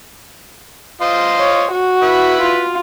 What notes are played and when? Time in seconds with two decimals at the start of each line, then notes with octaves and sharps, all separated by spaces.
1.01 F4 C5 D#5
1.39 C#5
1.72 F#4
2.02 E4 B4
2.41 F4